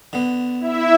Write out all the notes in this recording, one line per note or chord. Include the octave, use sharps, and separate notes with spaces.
D3 B3
E4 E5